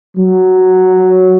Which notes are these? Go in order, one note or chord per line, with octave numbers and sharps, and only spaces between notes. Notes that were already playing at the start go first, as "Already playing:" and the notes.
F#3